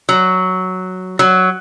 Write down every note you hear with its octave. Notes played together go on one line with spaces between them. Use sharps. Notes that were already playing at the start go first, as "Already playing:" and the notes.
F#3
F#3